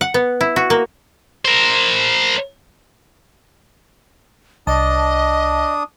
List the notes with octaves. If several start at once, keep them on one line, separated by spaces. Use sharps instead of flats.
F#5
B3
E4
F#4
A#3
A#4 C5
C2 D4 D#5 A5 D#6